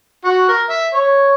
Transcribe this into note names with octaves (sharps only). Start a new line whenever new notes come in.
F#4
A#4
E5
C#5